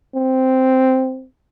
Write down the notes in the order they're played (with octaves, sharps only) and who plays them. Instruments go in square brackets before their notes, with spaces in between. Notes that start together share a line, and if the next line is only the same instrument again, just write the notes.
[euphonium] C4